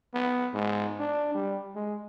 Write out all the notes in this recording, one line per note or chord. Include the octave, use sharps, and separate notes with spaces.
B3
G#2
D4
G3
G#3